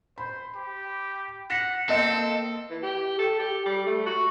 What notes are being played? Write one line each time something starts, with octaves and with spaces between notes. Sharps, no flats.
C5 B5
G4
F#5 A#6 B6 E7
A#3 C4 A4 D#5 E7
E3
G4
A4
G4
G3
A3
F#4